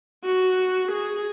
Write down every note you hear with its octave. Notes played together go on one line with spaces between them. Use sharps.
F#4
G#4